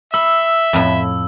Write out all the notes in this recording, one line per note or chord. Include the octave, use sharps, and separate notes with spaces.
E5 B5 E6
F2 A2